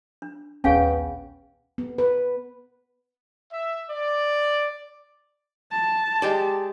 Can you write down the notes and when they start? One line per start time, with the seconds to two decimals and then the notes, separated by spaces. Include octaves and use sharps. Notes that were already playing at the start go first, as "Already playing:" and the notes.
0.22 D4
0.64 A#1 D#2 B3 C#4 G#4 F5 G5 G#5
1.78 B3
1.98 B4
3.52 E5
3.90 D5
5.72 A5
6.22 G#3 G4 D5